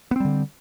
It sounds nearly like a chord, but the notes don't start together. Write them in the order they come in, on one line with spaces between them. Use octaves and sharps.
B3 C4 G3 D3